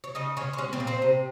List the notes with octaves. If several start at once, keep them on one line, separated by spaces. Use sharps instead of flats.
C#5
C#3 D#4 D#5
C#3 C#4 C#5
C5
G#3 C#4 C#5
C4 C5
A#2
C4 C5
C3